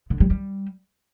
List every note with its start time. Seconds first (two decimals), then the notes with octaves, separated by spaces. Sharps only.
0.10 D3
0.20 G3
0.30 G3